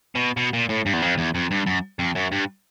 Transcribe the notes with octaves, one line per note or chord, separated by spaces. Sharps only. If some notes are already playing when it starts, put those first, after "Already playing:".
B2
B2
A#2
A2
G2
E2
F2
E2
F2
G2
F#2
F2
F#2
G2